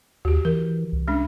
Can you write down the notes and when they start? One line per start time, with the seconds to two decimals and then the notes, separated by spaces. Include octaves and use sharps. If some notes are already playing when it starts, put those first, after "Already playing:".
0.25 D#2 F#4 G4
0.45 E3 A#4
0.93 C2
1.08 G#3 C#4 D4